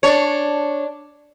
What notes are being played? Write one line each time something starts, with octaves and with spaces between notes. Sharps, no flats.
D4 C#5